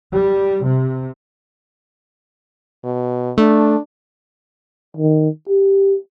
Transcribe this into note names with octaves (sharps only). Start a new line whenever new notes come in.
G3
C3
B2
A3 D4
D#3
G4